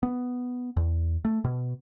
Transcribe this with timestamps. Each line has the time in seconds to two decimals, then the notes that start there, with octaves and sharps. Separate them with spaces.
0.03 B3
0.77 E2
1.25 A3
1.44 B2